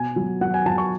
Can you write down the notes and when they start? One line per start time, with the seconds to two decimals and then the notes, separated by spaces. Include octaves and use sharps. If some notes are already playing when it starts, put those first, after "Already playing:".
Already playing: B2 G#5
0.16 F#3
0.41 F#3 F#5
0.54 G#5
0.66 F#3 A5
0.78 C#6